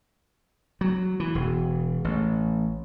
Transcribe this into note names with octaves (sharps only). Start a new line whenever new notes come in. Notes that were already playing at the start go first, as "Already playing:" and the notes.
F#3
E3
E1
A1